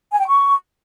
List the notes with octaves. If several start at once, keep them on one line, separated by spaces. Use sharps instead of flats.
G#5
G5
C#6